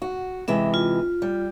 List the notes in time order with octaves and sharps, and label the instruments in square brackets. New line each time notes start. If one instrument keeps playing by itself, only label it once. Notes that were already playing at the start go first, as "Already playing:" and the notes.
[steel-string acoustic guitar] F#4
[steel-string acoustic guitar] C3 E3 G#3 [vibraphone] E5
[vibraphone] F4
[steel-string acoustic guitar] G3